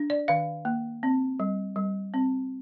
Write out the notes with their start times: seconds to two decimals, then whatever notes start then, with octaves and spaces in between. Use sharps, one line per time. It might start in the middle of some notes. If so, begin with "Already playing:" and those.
Already playing: D4
0.10 D5
0.28 D#3 F5
0.65 A#3
1.03 C4
1.40 G3
1.76 G3
2.14 C4